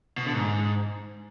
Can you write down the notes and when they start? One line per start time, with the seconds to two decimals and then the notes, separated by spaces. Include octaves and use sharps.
0.18 B2
0.26 D3
0.34 G#2